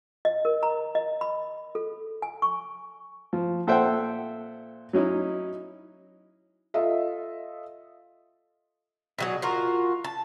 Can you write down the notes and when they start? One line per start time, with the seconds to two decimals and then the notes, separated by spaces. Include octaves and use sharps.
0.25 D#5
0.45 A#4
0.63 A#5
0.95 D#5
1.21 B5
1.75 A4
2.22 G#5
2.42 C#6
3.33 F3
3.67 A#2 A4 C5 E5 F#5 G5
4.93 F#3 C#4 D#4 E4
6.74 F4 A4 D#5 E5
9.18 B2 F#3 G#4
9.42 F4 F#4 A#4
10.04 A5